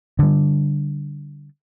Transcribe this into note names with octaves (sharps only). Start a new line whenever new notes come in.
D3 G3